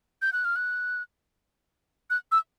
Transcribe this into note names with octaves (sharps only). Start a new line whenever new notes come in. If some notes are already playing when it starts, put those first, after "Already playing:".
G6
F#6
F6
F#6
F#6
E6